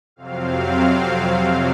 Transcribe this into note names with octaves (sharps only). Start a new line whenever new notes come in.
F2 C3 F#3 C4 F5